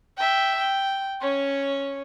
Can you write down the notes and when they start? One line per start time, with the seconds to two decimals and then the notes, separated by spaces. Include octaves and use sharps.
0.17 E5 G5
0.57 G5
1.21 C#4 C#5